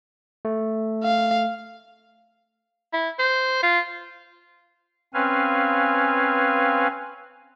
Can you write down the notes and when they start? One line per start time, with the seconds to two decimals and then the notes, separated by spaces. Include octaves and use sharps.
0.45 A3
1.04 F5
2.93 E4
3.19 C5
3.63 F4
5.14 C4 C#4 B4 F5 G#5